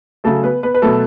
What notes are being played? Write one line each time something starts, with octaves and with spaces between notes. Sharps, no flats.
C#3 F#3 A3 A4
B3 B4
B3 B4
B4
B2 F#3 A3 A4